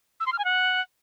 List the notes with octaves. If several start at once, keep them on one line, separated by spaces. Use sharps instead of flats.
E6
C6
F6
G#5
F#5